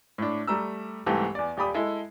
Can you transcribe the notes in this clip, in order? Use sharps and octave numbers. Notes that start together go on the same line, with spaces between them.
A2 D4
G3 A3 A#5 E6
C2 G#2 E3 A3 G4 A5
E2 D5
D#1 G4 D5 B5 D#6
G#3 E4 A4